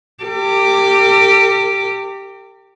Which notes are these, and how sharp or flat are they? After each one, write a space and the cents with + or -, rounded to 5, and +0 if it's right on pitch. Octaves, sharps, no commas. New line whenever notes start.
G4 +0 A#4 -45